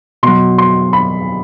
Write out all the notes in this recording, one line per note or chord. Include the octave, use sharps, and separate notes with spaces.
B2 F#3 C6
C6
B5